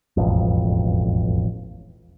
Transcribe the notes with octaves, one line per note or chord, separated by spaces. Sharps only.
E1 A1 F2